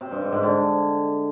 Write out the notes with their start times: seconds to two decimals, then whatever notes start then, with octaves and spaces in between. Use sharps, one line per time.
0.01 C3
0.11 G2
0.22 G#2
0.32 G#2
0.43 D3